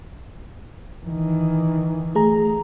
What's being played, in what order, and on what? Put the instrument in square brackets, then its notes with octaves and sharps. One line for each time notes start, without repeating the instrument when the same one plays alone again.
[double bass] D#3 E3
[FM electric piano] A3 G#4 A#5